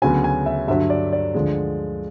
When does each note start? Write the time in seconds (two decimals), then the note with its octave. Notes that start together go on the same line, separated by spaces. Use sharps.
0.02 D2 C#3 F#3 B3 G#5
0.24 G#5
0.46 E5
0.68 G2 D3 F#3 E5
0.90 D5
1.13 D5
1.34 D2 D3 F3 G#3